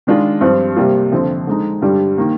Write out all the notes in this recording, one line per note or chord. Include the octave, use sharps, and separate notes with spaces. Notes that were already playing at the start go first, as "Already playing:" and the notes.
D#3 G#3 D4 F4
G2 F3 C4
C3 G3 A#3 F4
F2 D3 F3 C4
D3 G#3 D#4
G2 D3 G3 D4
D#3 A#3